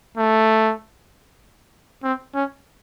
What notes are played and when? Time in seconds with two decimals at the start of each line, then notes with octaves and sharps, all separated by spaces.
0.17 A3
2.03 C4
2.35 C#4